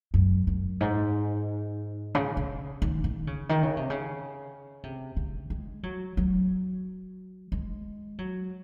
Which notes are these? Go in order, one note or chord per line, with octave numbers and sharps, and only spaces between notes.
F#2
F#2
G#2
C#3
C#3
D#3
D#3
C#3
D#3
C#3
C3
C#3
C3
C#3
G#3
F#3
F#3
G#3
F#3